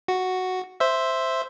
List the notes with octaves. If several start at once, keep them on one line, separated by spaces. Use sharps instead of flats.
F#4
C5 E5